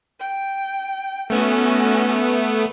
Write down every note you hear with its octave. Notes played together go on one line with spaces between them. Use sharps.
G5
A3 B3 C#4 F#4